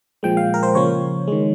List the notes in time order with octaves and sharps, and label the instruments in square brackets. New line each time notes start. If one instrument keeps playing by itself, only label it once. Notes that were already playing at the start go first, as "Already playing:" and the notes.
[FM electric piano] A#2 F3 G#3 G5
F5
A#4
C5
C#3 F3 A#3 C#5
D#3 G#3